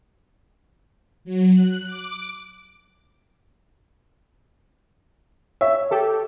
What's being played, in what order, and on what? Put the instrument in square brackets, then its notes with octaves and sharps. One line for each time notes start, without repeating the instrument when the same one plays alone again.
[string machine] F#3
F#6
D6
[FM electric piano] C#5 [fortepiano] E5
[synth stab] G4 A4